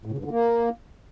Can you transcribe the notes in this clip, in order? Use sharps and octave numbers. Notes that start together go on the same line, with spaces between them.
A2
C#3
G2
D3
A#3